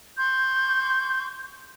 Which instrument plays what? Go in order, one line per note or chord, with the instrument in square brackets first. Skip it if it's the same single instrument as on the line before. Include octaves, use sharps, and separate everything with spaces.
[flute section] C6 C#6 G6